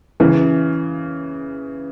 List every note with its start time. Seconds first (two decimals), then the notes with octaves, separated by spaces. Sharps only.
0.20 C#3 E3